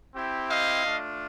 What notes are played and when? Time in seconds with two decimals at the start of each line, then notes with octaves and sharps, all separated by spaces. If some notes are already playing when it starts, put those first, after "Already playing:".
0.15 C4 E4 G4
0.48 D#5 F5
0.82 A3 D4 F4